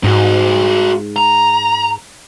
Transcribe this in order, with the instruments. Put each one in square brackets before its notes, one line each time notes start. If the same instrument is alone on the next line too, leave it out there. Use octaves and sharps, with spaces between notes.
[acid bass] G#2 [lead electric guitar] D#4 F#4
[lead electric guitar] A#5